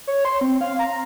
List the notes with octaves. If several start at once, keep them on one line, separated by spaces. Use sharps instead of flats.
C#5
C6
C4
F5
A#5